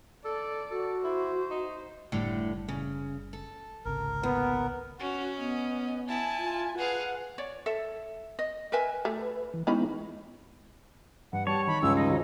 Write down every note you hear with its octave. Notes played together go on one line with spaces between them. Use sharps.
A4 D5
F#4 A4
E4 C5
D#4
F#1 A2 D3 G3 A3
C#3
A4
G#1 C#2 C3 A#4
D#2 B3
C#4 F#4
B3 D#5
E4 G#5 A5
F4
G#4 B4 F5 F#5
C#5 D5
A4 E5
D#5
A#4 B4 E5 G#5
A3
B4
E3
G#3 B3 C#4 D#4 E4 B5
G2 F#5
G3 C#5 A5
D#3 B5
C#2 G2 E6
D#4 D#5
D#3 F4 C5